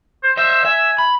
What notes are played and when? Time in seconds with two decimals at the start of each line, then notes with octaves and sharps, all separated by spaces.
0.23 C5
0.37 C5 D#5 E5
0.65 E5 G#5
0.98 B5